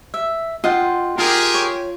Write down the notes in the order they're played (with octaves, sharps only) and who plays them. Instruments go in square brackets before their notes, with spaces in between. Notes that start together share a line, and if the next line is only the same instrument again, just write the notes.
[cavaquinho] E5
[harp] F4 [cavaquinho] D#5 F#5 G5
[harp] F4 [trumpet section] G4 G#4 A#4
[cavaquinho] C#5